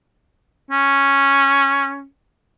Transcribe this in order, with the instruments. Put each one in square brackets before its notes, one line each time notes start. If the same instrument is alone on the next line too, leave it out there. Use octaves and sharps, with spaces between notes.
[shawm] C#4